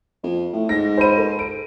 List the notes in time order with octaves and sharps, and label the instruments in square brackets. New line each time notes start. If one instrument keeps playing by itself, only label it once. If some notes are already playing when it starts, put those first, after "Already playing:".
[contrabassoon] F2
A2
[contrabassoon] G#2 [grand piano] A#6
[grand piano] C5 B5 D#7
A4
D7